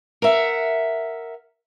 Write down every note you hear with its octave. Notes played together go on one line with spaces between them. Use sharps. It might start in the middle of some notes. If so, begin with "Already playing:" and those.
A#4 E5 F#5